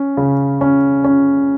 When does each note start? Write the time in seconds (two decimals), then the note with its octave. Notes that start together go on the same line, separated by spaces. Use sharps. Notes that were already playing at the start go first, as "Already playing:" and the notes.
Already playing: C#4
0.17 C#3
0.61 C#4
1.04 C#4